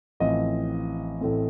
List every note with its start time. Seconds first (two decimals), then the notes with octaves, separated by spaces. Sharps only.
0.20 A1 A2 F3 C4 D#5
1.21 A1 A2 A3 C4